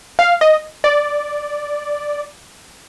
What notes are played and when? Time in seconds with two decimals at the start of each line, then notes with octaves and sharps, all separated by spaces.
0.19 F5
0.41 D#5
0.84 D5